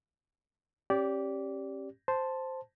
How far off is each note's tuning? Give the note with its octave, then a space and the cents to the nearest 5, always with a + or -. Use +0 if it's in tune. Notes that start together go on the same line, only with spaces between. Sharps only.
C#4 -40 G4 +0 D5 -20
C5 +0 A5 +0